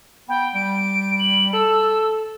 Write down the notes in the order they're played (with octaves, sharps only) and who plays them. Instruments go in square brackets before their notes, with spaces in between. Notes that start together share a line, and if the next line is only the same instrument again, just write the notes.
[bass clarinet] B3 [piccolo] G5
[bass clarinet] G3 [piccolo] D7
[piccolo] F#7
[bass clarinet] A4 [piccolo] E6